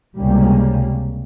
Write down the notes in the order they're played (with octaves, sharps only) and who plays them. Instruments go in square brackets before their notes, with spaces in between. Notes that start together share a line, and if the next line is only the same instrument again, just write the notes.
[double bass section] C#2 C3 G3 A#3 C#4